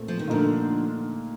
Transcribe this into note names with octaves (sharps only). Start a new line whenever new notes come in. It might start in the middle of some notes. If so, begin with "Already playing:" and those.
Already playing: A#2 A3 C4
F3
D#3
A#2 D3 F3 A3 D#4 A#4